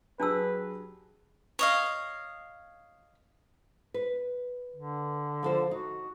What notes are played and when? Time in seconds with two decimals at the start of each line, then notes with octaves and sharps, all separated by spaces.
0.20 F#3 D4 G4 G#4 B4 A5 E6
1.59 C#5 D#5 F5
3.94 B4
4.76 D3
5.43 F3 A4 C5
5.71 D#4 F#4